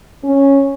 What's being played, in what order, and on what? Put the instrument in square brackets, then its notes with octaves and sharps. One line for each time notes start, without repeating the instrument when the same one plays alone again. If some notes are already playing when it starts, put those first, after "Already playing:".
[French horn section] C#4